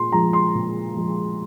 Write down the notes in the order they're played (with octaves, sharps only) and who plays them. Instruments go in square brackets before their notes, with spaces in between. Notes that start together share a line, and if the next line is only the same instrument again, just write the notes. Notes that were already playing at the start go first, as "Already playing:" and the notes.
Already playing: [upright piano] A#2 C6
F3 G#3 A#5
C6
A#2
F3 G#3